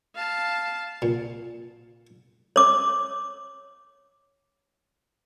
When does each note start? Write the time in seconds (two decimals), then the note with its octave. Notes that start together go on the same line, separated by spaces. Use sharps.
0.15 F5 A5
1.02 A#2
2.56 C#5 D6